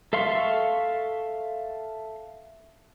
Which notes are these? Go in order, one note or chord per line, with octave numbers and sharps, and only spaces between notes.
A4 E5 F5 C6 C#6